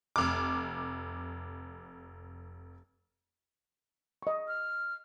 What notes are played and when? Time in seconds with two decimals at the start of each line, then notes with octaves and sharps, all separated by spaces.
0.16 F1 D6
4.23 D#5 C#6
4.48 F6